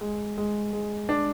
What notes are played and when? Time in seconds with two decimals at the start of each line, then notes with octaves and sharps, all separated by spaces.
0.01 G#3
0.38 G#3
0.73 G#3
1.09 D4